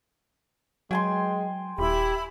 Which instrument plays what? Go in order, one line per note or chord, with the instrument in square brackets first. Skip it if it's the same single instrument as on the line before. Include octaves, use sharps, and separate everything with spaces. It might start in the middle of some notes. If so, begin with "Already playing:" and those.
[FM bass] F#3 [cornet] G#3 [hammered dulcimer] G5 G#5 C6
[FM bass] D#1 [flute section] E4 B5 [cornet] G4